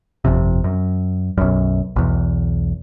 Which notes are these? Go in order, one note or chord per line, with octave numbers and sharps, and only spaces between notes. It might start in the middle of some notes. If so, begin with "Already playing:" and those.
G1 F2 C3
F#2
B1 F#2
B1 E2